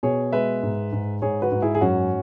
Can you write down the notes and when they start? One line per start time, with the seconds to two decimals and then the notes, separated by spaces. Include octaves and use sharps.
0.03 B2 G#4 C#5
0.33 G#3 B4 E5
0.63 G#2
0.93 G#2
1.22 G#2 G#4 C#5
1.42 F#4 B4
1.52 G#2
1.62 E4 G#4
1.75 G#4
1.81 F#2 C#4 F#4